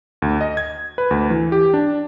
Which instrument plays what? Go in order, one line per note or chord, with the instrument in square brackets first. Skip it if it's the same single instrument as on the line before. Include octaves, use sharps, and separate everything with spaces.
[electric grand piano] D2
D#5
G#6
B4
D2
E3
G4
D4